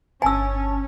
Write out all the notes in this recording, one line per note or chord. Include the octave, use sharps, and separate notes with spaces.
G1 C#4 G#5 A5 E6